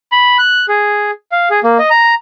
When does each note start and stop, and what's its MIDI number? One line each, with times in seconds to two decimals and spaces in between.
0.12 0.38 83
0.39 0.66 90
0.68 1.11 68
1.32 1.49 77
1.50 1.60 68
1.64 1.78 58
1.79 1.89 75
1.90 2.14 82